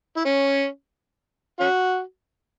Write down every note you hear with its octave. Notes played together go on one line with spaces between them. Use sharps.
E4
C#4
C#4 F#4